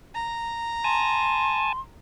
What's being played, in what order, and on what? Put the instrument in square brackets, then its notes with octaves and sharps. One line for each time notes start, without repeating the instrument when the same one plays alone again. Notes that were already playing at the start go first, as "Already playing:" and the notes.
[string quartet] A#5
[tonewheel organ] G#5 A5 [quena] C6